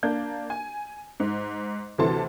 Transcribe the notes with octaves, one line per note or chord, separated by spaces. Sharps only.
A#3 D4 G6
G#5
G#2
D2 C3 E3 A4 A5 C6